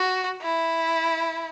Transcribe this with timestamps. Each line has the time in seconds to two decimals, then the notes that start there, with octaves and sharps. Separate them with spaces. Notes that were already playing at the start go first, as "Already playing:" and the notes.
Already playing: F#4
0.42 E4